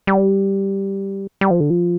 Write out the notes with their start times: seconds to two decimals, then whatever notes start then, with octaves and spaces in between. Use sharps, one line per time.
0.07 G3
1.41 G3
1.51 F3
1.60 D3
1.70 F3